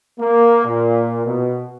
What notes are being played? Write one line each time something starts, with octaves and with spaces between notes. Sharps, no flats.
A#3
A#2
B2